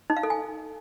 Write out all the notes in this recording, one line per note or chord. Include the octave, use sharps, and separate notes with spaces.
D#4
F5
A4
G#5